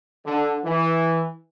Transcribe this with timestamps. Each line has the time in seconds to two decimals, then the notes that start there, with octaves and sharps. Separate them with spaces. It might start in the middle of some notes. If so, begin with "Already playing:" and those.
0.25 D3
0.64 E3